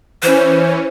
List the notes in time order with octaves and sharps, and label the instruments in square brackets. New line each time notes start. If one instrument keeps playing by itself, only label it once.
[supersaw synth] E3 C#4 [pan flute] C5